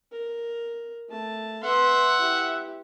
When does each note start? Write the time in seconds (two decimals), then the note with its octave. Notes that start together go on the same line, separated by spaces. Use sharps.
0.12 A#4
1.09 A3 A5
1.64 B4 E5 F#5 C6
2.19 E4 G4